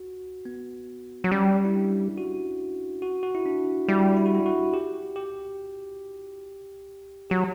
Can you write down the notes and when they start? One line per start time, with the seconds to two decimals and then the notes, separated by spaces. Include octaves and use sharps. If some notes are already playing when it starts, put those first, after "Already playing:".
Already playing: F#4
0.45 B3
1.24 F#3
1.32 G3 C#4
1.65 E4
1.74 D4
2.18 F#4
3.02 F#4
3.23 F#4
3.35 E4
3.46 D4
3.89 G3 E4
4.17 E4
4.26 F#4
4.35 E4
4.46 F#4
4.74 G4
5.16 G4
7.30 F#3 G4